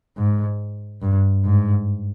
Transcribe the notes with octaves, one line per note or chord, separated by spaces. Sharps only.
G#2
G2
G#2